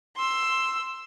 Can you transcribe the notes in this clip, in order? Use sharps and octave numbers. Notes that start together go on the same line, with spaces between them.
C6 E6